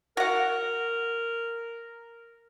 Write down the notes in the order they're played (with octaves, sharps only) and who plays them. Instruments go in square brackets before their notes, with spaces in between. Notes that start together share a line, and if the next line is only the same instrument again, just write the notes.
[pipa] F#4 F#5 [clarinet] A#4